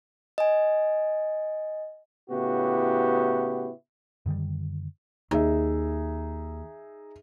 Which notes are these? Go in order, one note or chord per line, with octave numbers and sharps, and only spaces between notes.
D#5 G#5
A2 C#3 B3 E4 F#4 G4
F#2 D3 D#3 G3
D#2 D#4 G#4 E5